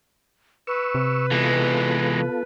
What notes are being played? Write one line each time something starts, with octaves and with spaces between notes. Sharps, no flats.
B4 C#6 E6
C3
E3 G#3 B3 F4 A4